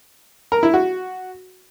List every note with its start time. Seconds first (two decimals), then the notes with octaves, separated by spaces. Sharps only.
0.52 A#4
0.63 E4
0.74 F#4